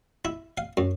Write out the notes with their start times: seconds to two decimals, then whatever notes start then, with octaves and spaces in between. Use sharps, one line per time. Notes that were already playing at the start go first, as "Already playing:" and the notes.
0.25 E4
0.58 F5
0.77 F#2